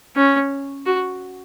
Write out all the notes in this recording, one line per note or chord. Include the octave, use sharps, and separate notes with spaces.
C#4
F#4